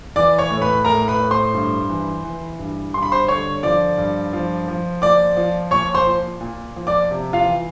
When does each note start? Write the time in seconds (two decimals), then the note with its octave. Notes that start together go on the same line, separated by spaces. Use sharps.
0.16 E3 D5 D6
0.39 C#5 C#6
0.50 A2
0.61 B4 B5
0.85 A2 A#4 A#5
1.08 B4 B5
1.20 A2
1.31 C5 C6
1.54 G2
1.90 E3
2.25 E3
2.59 G2
2.94 G2 C6
3.03 B5
3.12 C5 C6
3.28 D3 C#5 C#6
3.63 F3 D5 D6
3.98 G2
4.33 F3
4.68 F3
5.02 A#2 D5 D6
5.37 F3
5.71 A#2 C#5 C#6
5.94 C5 C6
6.07 A#2
6.41 A#2
6.76 F3
6.87 D5 D6
7.11 C3
7.33 F4 F5
7.46 E3